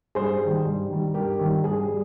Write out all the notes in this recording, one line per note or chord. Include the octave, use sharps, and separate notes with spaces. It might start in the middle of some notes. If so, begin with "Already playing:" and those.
G2 G#4 C5
D#3 G3
G2
D#3 G3
G2 G4 A#4
D#3 G3
G2 G#4
G3